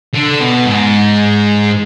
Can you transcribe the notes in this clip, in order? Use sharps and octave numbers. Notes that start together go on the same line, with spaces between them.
D3
B2
G#2